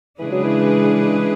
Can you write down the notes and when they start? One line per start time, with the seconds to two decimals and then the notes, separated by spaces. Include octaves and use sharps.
0.19 C#3 E3 G#3 D4 G#4 B4
0.32 F#3
0.44 E3